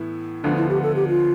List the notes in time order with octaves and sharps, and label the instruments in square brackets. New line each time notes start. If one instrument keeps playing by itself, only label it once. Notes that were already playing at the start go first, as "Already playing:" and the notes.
Already playing: [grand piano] A2 E3 B3 E4
[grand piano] D2 D3 F3 B3 [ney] D4
[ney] E4
G4
A4
G4
F4